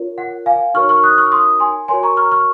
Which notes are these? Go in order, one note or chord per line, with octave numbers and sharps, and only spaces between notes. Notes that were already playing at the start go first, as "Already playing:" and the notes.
Already playing: F4 A#4 C#5
F#5
F5 G#5
D#4 F#4 A#4 C#5 C#6 F6
C#6 F6
D#6 F#6
C#6 F6
C6 D#6
G#5 C6
F#4 A#4 C#5 G#5 C6
A#5 C#6
C#6 F6
C#6 F6